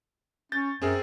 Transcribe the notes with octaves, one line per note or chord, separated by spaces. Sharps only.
C#4 G6 A6
F#2 C4 G#4 A#4